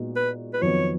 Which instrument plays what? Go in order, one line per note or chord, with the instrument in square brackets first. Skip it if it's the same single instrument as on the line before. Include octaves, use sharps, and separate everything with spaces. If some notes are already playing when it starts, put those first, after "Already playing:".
Already playing: [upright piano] A#2 G#3 B3 D#4 F#4
[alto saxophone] B4
B4
[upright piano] F2 D#3 F#3 B3 D#4 [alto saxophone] C#5